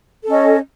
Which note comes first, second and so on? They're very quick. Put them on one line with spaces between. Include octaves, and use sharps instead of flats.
A4 C#4 D#5